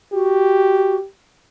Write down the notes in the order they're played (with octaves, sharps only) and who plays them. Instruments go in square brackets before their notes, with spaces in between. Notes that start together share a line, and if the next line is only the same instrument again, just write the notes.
[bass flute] F#4 [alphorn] G4